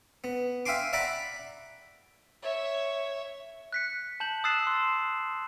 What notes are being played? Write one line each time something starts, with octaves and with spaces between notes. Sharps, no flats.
B3
E5 F5 G5 G#5 C6 D6
D5 E5 F#5 A#5 B5 D6
C#5 E5
F#6 B6 C#7
A5 G6 F#7
D#6 E6 F#6 A6 C7 E7
C6 E6